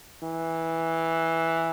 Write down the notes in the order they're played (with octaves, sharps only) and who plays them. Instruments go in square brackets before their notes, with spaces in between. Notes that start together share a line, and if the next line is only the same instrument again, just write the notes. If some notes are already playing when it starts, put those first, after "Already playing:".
[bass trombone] E3